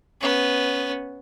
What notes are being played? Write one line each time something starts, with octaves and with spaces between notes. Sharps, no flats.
B3 C#4